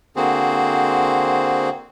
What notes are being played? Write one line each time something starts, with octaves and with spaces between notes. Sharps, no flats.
D3 A#3 C4 F#4 G#4 C5